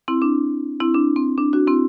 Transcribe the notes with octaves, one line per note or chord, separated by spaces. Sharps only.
C4 E4
D4
C4 E4
D4
C4
D4
D4 F#4
C4 E4